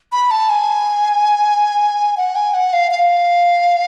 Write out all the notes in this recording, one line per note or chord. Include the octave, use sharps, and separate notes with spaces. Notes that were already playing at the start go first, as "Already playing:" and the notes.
B5
A5
G#5
F#5
G#5
F#5
F5
F5